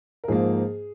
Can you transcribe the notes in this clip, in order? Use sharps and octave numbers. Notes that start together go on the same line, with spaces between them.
A#4
G#2 F3 A#3 G#4